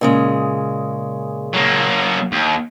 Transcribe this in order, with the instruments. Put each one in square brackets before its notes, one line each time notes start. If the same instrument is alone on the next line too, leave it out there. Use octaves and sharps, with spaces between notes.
[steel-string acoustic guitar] A#2 C#3 G#3
[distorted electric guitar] F#3 A#3
D#2